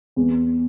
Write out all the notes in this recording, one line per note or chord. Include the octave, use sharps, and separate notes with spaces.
E2